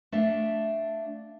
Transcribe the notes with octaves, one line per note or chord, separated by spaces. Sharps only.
A3 D4 E5 F5